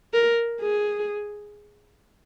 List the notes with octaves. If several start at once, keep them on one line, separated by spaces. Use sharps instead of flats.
A#4
G#4